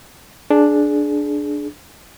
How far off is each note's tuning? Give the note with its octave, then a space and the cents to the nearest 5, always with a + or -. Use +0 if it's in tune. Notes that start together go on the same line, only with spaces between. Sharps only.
D4 +0 G#4 +20